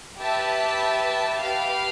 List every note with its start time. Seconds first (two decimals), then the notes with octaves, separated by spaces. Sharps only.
0.18 G4 B4 E5 A5
1.40 G4 B4 F5